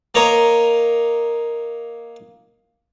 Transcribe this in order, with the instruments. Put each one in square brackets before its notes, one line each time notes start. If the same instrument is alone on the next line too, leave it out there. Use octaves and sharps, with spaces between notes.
[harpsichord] A#3 A#4 C#5 D#5 A#5